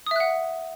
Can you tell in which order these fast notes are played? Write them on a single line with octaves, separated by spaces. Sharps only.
D#6 E5 F#6 F#5